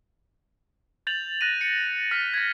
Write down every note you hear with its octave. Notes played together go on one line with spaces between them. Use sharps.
G6 A6 F7 F#7
F#6 A#6 D#7
C#7
F6 A6 B6
G#6 A#6